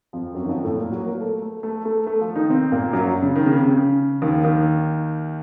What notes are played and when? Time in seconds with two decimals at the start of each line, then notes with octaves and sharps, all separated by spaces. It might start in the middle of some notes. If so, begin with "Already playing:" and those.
0.13 F2 F3
0.34 F#2 F#3
0.45 D#3
0.49 F2 F3
0.64 A2 A3
0.77 A#2 A#3
0.91 F#3 F#4
1.06 A#3 A#4
1.21 A3 A4
1.42 A3 A4
1.63 A3 A4
1.85 A3 A4
2.07 A3 A4
2.21 F3 F4
2.36 D#3 D#4
2.50 C3 C4
2.72 A#2 A#3
2.93 F#2 F#3
3.22 C#3
3.36 D#3
3.46 C#3
3.57 C3
3.68 C#3
4.22 D#2 D#3
4.44 D#2 D#3